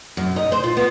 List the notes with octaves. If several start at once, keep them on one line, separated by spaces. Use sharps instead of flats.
F#2
D#4
C5
F4
B3